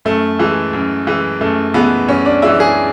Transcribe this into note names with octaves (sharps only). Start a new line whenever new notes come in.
F#2 A3
E3 G#3
F#2
E3 G#3
F#2 A3
E3 G#3 B3
F#2 C#4
D4
E3 G#3 E4
G#4